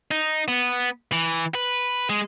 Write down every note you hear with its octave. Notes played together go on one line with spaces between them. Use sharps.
D#4
B3
E3
B4
G#3